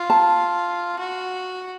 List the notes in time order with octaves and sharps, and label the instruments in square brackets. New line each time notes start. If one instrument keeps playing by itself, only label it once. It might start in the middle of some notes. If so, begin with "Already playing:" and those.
Already playing: [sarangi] F4
[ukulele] A5
[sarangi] F#4